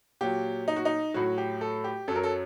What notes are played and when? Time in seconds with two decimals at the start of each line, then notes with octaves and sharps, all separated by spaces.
0.21 A#2 F#3 G4
0.68 D#4
0.76 F#4
0.85 D#4
1.14 A2 F#3 F#4
1.38 G4
1.61 A4
1.84 G4
2.08 F#2 F#3 A4
2.16 A#4
2.23 A4